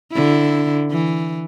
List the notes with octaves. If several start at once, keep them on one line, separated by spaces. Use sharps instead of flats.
D3 E4
E3